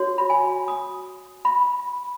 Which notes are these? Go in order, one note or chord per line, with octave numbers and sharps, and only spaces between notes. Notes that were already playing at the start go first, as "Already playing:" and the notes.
Already playing: F#4 C#5
B5
G#5
D#6
B5